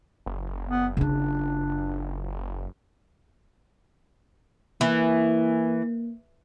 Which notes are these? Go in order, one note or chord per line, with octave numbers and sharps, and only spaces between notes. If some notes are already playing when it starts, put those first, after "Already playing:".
F#1
B3
C#3 D4 F4
E3 A#3